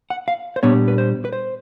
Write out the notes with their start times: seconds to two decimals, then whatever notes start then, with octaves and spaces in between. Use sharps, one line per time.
0.10 F#5
0.28 F5
0.56 C5
0.63 A#2 G3 B3 D4 C#5
0.88 B4
0.98 C5
1.25 B4
1.33 C5